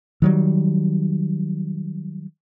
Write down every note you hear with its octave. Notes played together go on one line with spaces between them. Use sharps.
D#3 F#3 G3